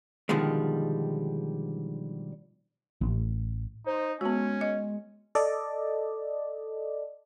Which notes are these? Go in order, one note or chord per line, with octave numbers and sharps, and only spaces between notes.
B2 D3 D#3 F3 G3 G#3
A1
D#4 C5
G#3 B3 C#4 F#4
D#5
A4 D5 D#5